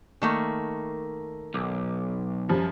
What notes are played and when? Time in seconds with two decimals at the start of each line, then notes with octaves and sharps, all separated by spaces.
0.22 D#3 A3 A#3
1.54 B1 D6
2.49 F#2 F3 G3